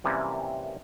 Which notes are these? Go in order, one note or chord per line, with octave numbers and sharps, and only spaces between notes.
F#2 C3 E3 G3 A#3 C#4